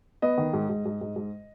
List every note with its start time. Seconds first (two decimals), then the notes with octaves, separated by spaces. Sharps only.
0.22 B3 D#5
0.38 D#3
0.53 G#2
0.69 G#2
0.86 G#2
1.01 G#2
1.16 G#2